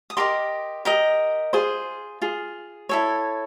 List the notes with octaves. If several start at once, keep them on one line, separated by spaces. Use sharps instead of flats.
D#6
G4 A#4 D#5 C6 D6
G4 A#4 D#5
F4 G#4 C5
F4 G#4
E4 A4 C#5